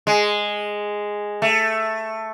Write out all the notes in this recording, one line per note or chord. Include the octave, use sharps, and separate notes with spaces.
G#3
A3